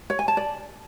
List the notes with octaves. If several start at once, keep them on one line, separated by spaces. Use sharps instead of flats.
C#5
G#5
A5
D5